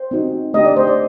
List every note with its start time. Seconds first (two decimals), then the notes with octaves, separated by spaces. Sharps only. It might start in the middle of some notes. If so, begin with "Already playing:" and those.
Already playing: C5
0.11 C4 D#4 F#4
0.54 A3 D4 G4 D#5
0.65 D5
0.76 C5
0.87 D5